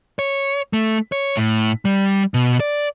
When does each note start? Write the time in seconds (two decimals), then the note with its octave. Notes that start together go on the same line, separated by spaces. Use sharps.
0.19 C#5
0.73 A3
1.12 C#5
1.37 A2
1.85 G3
2.34 B2
2.60 D5